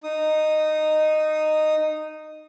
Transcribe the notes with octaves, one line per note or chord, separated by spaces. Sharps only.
D#4 D#6